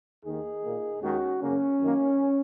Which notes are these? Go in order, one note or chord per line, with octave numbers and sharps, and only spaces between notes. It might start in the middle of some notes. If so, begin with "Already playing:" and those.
D#2 D#3 A#3 D#4 G#4
A#2 A#3
D#2 D#3 G#3 C#4 F#4
F#2 C#3 A#3 C#4
F#2 D#3 A#3